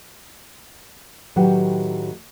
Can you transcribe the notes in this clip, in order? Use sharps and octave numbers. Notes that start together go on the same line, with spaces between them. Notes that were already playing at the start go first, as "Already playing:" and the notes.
A2 D#3 F#3 G4 B4 F#5